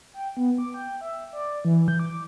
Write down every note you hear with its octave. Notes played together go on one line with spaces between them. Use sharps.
G5
B3
D6
G5
E5
D5
E3
G6
D6